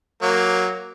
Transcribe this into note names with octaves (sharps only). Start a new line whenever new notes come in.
F#3 A#3